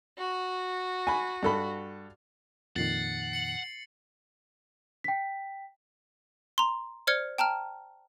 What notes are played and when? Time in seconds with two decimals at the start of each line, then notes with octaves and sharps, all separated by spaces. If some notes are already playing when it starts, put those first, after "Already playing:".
0.18 F#4
1.07 G#5 B5
1.43 G2 A4 B5
2.76 F2 A#2 D#3 F#5 A6 C7
3.33 C#7 F#7
5.04 G5 B6
6.58 A#5 C6
7.07 C5 D5 F6 G#6 C#7 G7
7.38 G5 A5 A#5 F6